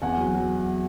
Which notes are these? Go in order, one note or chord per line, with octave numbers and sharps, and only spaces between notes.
E2 F#5 G#5
F#3
F#3